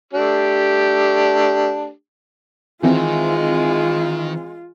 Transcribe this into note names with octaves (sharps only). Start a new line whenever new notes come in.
A3 D4 G4
D#3 E3 G#3 C4 F4